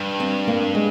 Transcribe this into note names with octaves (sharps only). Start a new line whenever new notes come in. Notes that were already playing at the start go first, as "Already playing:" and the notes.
Already playing: G2
C4
A#3
G#3